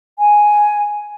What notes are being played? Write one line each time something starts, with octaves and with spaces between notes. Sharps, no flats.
G#5